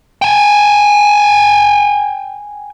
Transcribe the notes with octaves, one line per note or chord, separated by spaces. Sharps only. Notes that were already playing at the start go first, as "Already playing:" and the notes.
G5 G#5